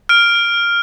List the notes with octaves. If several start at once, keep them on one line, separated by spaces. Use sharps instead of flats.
F6 D7